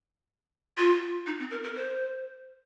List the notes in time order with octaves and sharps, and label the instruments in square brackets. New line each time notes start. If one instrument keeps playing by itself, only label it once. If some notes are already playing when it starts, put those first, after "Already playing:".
[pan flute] F4
D#4
C4
A#4
A#4
C5